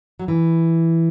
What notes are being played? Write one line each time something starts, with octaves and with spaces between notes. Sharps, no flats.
F#3
E3